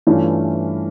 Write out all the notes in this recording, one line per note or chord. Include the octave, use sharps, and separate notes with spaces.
G2 E3 A3 C#4 F4